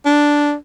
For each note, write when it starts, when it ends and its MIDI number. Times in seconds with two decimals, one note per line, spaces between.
0.05 0.55 62